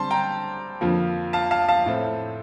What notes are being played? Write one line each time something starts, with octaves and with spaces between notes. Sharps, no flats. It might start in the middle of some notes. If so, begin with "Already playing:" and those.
Already playing: D3 G3 C4 A5 C6
G5 A#5
F2 D3 F3 A#3
F5 A5
F5 A5
F5 A5
A2 A3 C4